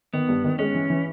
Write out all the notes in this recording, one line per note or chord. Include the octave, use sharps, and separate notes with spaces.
D#3 B3
G2
D#3
G#3 C#4
E3
E3